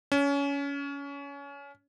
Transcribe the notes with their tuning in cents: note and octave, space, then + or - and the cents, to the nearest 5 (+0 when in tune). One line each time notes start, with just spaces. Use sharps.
C#4 +25